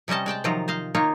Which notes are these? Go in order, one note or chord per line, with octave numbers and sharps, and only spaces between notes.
C3 G3 C#4 D#5 A5
G#3 D5 G5 A5
C3 D#3 F3 F#3 F4 A#5
C5 D#5 F5
D#3 A#3 D#4 F4 C#5